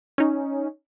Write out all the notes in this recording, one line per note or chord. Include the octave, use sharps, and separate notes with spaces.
C#4 D#4